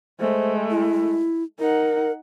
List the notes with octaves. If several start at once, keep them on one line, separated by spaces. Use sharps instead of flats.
G#3 A3 C5
E4
D#4 A#4 F#5